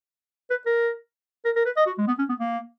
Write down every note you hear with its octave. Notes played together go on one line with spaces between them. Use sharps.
B4
A#4
A#4
A#4
B4
D#5
F#4
G#3
B3
C#4
B3
A#3